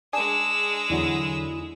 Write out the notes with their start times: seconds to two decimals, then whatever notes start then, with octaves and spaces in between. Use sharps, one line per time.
0.13 G#3 D4 G#4 E6
0.90 E2 D3 F#3 E4